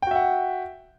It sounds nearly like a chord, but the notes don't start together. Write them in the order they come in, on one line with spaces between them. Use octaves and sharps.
G5 F#4 E5 F#5